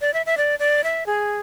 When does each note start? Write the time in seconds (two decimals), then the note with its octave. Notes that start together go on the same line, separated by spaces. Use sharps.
0.01 D5
0.14 E5
0.26 E5
0.37 D5
0.59 D5
0.84 E5
1.06 G#4